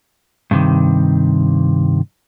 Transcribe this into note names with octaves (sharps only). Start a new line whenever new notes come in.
G2 C3 D#3